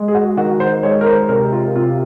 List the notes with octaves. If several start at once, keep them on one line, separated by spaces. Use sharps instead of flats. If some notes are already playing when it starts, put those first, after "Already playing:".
Already playing: G#3
G#4
F#4
D#3 F#4
C5
G#3 C#5
A#4
C5
C3 A#4
F4
C3 F4